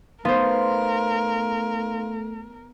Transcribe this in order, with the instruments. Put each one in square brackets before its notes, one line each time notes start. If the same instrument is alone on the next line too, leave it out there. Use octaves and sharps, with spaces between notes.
[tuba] A3 [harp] B3 C5 [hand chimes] D#4 F5 C6 [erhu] A#4